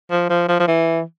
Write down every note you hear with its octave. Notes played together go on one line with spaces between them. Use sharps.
F3
F3
F3
F3
E3